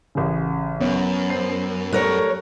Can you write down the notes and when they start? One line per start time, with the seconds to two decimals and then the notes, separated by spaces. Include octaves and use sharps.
0.15 A1 C#3
0.80 F#2 B3 C#4
1.29 C5 C7
1.92 G3 A3 A#4 C#5 F#6